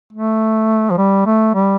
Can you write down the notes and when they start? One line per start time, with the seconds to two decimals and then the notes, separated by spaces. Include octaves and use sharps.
0.13 A3
0.90 F3
0.98 G3
1.26 A3
1.54 G3